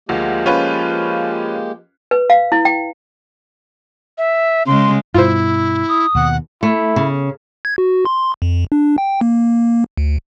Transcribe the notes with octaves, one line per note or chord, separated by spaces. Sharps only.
D2 F3 G#3 A#3 G4
C#4 F4 B4
B4
F5
E4
G5
E5
C#3 G#3 C6
G2 B2 E4 F4 C5
D#6
D#2 B2 F#5
A3 E4
C#3
G#6
F#4
C6
F2
D4
G5
A#3
D2